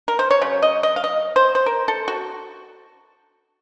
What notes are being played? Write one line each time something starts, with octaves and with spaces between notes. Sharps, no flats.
A#4
C5
C#5
C#3 F#3
D#5
D#5
F5
D#5
C5
C5
A#4
A4
F#4